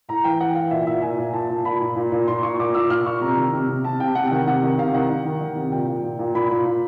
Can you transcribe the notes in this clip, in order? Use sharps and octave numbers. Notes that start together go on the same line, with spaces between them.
A2 A#5
E3 G5
E3 F#5
E3 F5
A#2 E5
A#2 E5
A#2 G#5
A#2
A#2 A5
A#2
A#2 B5
A#2
A#2
A#2
A#2 C6
A#2 C#6
A#2 D6
A#2 E6
A#2 F6
A#2 C#6
C3 A#5
D#3
C3
C3
C3 A5
C3 G5
C3 F#5
D#3 F#5
C3 F#5
D#3
C3 F5
D#3 F#5
D#3
D#3
D#3
C3
A#2 G5
A#2
A#2
A#2
A#2 B5
A#2
A#2